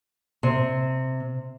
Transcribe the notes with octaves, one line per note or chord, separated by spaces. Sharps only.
C3